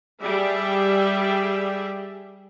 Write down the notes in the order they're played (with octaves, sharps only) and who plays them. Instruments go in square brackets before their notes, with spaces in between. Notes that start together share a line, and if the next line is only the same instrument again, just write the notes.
[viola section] G3 G4 G#4 E5